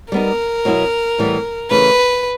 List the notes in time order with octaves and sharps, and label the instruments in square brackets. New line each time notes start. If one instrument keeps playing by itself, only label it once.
[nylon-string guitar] G3 B3 D#4 [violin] A#4
[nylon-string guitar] B2 F#3 B3 E4
A2 E3 G3 B3
[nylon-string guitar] C#3 E3 A3 [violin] B4